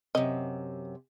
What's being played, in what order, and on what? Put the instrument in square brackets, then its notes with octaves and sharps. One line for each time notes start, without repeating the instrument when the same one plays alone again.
[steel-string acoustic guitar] F#2 C3 [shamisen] D#5